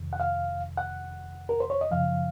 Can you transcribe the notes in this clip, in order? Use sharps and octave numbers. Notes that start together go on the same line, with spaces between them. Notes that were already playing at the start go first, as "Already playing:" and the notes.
Already playing: F2 C3 D#3
F#5
F5
F#5
A#4
C5
C#5
D#5
F#2 C#3 F3 F5